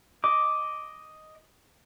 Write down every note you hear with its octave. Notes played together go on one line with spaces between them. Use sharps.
D#5 D6